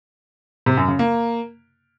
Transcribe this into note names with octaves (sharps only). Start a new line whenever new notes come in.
C3
F#2
C#3
A#3